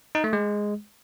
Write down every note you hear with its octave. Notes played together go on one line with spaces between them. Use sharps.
D#4
A3
G#3